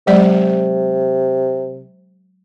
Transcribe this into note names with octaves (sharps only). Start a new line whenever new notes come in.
C3 F#3 G#3 D5